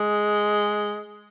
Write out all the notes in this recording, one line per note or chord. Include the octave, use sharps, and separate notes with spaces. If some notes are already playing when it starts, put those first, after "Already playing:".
Already playing: G#3